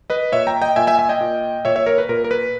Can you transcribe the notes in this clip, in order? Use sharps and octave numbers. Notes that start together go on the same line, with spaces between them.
B4 D#5
A#2 C#5 E5
G5 A#5
D#5 G5
A#2 E5 G#5
E5 G#5
E5 G#5
D#5 G5
A#2
A#2 C#5 E5
C#5 E5
A#4 C#5
B4
A#2 A#4
A#4
B4